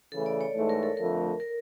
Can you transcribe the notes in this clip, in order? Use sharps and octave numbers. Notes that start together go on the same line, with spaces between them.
C#3 E3 A3 A4
D5
C#5
G#2 E3 A3
A#4
A4
F2 D3 F3 A3 A#4
A#4